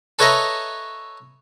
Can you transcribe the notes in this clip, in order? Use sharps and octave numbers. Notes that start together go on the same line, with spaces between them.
A4 B4 C#5 D#5 E5 A#5